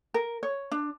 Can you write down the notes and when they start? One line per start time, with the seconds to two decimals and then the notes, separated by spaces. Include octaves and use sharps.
0.14 A#4
0.43 C#5
0.71 D4